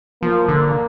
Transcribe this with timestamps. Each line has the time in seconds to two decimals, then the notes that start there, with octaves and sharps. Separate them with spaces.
0.23 F3 A#3
0.48 D3